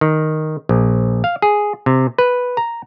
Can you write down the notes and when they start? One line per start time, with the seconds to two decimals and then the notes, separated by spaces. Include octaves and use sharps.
0.01 D#3
0.69 A#1
1.24 F5
1.42 G#4
1.86 C3
2.18 B4
2.57 A#5